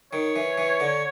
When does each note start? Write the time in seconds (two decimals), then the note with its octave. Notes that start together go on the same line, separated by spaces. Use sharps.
0.13 D#3 C#5
0.36 E3
0.58 E3
0.80 D3